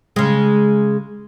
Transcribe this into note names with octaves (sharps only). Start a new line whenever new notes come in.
C#3 G#3